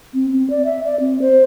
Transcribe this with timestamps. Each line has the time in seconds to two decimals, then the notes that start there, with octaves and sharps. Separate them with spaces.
0.14 C4
0.32 C4
0.50 D5
0.65 E5
0.85 D5
1.00 C4
1.22 C5